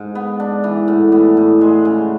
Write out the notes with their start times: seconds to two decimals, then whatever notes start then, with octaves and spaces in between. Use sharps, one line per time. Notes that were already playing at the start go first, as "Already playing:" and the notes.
Already playing: G#2
0.15 B3
0.40 D4
0.64 E3
0.88 A2
1.12 B3
1.37 A2
1.61 G#3
1.85 C#3